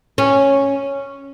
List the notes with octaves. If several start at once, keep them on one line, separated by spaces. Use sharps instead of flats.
C#4